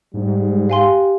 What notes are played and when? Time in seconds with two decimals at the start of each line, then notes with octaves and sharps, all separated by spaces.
0.14 G#2 G3
0.70 G4 F5 G#5 C6